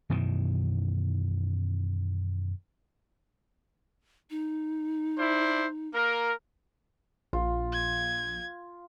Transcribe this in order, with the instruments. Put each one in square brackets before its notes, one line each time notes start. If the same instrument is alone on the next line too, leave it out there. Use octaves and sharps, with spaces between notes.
[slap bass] F#2 B2 D#3 E3
[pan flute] D#4
[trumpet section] D4 E4 C5
A#3 A#4
[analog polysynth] A#1 [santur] F4
[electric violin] G#6